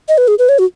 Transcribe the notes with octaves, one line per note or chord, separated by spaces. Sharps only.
D#5
B4
G#4
B4
C#5
F#4